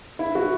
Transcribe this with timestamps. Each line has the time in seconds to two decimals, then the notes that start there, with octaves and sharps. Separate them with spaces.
0.19 E4
0.35 F#4